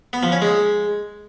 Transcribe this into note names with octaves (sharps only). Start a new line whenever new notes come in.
B3
F3
C#4
G#3